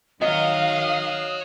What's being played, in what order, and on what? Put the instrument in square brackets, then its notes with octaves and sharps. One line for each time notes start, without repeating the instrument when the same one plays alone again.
[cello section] D#3 F5 [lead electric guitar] C#5 F#5 [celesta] D#5 [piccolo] D#6